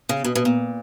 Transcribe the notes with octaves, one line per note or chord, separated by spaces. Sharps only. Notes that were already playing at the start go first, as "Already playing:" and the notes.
C#3
B2
B2
A#2